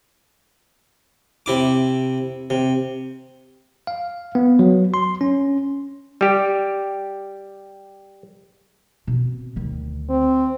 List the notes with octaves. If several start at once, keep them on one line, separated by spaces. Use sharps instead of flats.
C3 E4 D6
C3
F5
B3
F#3
C6
C#4
G3 G4
B2 C4
D2 D#3
C4